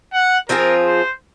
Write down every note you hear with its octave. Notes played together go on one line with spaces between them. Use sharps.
F#5
F3 C4 F4 G#4 A#4
C5